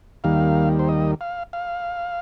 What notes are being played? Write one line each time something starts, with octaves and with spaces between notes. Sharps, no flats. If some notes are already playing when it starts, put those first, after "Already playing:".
D#2 D#3 G3 A#3 F5
C5
D#5
F5
F5